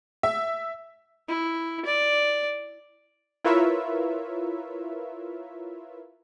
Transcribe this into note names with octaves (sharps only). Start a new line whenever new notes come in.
E5
E4
D5
E4 F4 A#4 B4 C#5 E5